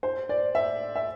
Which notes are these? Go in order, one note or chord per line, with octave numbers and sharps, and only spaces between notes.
C5
D5
E5
E5